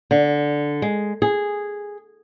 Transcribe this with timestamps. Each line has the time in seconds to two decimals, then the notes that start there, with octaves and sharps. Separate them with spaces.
0.11 D3
0.82 G#3
1.22 G#4